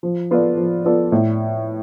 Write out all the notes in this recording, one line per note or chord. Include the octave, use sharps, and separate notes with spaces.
F3
B3 F4 A4 D5
F3
B3 F4 A4 D5
A2